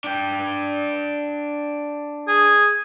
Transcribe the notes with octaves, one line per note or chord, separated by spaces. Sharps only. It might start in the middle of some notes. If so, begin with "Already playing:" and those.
D4 G5
G#4